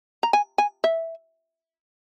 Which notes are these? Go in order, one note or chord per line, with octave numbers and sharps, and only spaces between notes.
A#5
G#5
G#5
E5